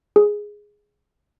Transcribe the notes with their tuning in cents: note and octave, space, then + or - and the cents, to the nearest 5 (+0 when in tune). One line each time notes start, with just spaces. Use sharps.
G#4 +0